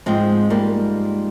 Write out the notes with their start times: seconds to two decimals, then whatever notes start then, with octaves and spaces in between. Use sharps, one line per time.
0.06 G#2 F3 G#3 C4
0.50 G3 A#3